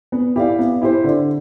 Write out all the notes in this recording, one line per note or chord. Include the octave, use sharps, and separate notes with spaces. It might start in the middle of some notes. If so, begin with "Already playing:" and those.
B3
E4 G4 D5 F5
B3
E4 G4 C5
D3